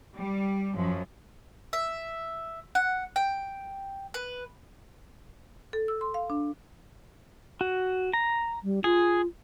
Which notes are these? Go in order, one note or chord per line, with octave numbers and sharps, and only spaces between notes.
G3
F#2 F3
E5
F#5
G5
B4
A4
E6
C6
F5
D4
F#4
A#5
G3
F4 G#4